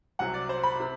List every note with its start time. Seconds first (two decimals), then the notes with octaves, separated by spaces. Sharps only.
0.19 C2 C3 F#3 F#5
0.34 D5
0.49 C5
0.63 B5
0.80 C3